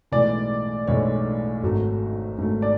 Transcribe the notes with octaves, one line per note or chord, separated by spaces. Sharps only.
B1 A2 E3 G#3 D5
B1 A2 E3 G#3 C#5
G#1 G#2 F#3 A3
G#1 G#2 F#3 A3
D5